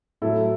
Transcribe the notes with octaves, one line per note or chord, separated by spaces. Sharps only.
A2 F#3 E4 A4